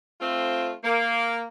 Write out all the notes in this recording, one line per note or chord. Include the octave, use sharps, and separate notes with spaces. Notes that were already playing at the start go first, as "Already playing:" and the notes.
A3 C4 F4
A#3